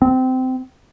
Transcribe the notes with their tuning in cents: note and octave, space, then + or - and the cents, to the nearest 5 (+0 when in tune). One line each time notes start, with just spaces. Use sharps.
C4 -20